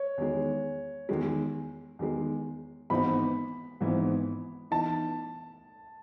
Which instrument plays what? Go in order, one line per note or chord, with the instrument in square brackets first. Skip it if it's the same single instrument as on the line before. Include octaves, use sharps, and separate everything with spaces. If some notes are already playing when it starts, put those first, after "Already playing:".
Already playing: [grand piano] C#5
[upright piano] E2 D#3 G#3
E2 D#3 G#3
E2 D#3 G#3
[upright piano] G#1 G#2 E3 B3 D#4 [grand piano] B5
[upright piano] G#1 G#2 E3 B3 D#4
[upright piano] E3 B3 D#4 [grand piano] A5